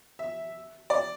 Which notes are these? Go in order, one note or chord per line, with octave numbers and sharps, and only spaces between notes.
E5
D5